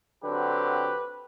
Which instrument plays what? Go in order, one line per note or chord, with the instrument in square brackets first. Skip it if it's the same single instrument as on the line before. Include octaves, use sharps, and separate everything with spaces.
[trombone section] D3 F#3 C4 G4 B4